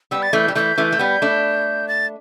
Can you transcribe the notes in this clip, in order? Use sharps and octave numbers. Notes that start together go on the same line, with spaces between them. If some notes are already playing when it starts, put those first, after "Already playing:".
G3 B3 E6
A6
E3 A3 G6
G3
E3 A3 G6
E3 A3
A3
G3 B3
A3 D4
A6